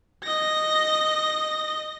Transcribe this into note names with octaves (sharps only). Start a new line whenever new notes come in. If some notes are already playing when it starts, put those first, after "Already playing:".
D#5 A#6